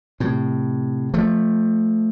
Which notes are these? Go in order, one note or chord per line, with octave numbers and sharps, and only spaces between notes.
A2 C3
F3 A3